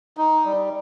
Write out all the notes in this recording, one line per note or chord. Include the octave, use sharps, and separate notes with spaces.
D#4
G3